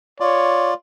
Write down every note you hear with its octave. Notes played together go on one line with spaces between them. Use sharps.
F4 C#5 D5